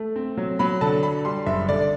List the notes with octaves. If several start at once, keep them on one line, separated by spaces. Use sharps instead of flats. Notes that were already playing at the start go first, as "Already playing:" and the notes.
Already playing: A3
C4
F#3
F#3 B5
D3 A5
D4 B5
G3 C6
F#1 E5
D3 D5